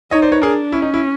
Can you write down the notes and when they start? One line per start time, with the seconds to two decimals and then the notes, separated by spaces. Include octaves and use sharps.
0.11 D#4 C#5 D#5
0.22 C5 D5
0.32 B4 C#5
0.42 D4 G#4 A#4
0.72 C#4 E4
0.82 D#4
0.94 E4